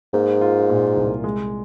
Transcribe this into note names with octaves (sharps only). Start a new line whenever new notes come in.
G#2 A#3
F4
A#2
C2
G#3